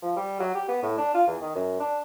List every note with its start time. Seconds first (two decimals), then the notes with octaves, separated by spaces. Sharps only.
0.02 F3
0.16 G3
0.40 F#3
0.55 G4
0.68 B3
0.82 A2
0.98 D4
1.14 F4
1.27 E2
1.41 D#3
1.55 F#2
1.80 D4